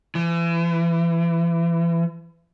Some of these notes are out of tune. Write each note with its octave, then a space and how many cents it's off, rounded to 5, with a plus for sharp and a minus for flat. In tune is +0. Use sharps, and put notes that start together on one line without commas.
E3 +35